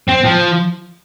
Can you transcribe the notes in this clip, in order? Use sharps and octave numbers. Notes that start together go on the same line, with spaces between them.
C4
F3